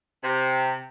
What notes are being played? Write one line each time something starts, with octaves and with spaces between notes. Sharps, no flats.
C3